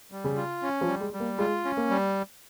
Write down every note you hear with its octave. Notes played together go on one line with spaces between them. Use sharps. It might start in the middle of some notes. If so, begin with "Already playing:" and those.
G3
C#3
F4
C#4
F3
G3
G#3
G3
A#3
G#3 F4
C#4
A#3
G3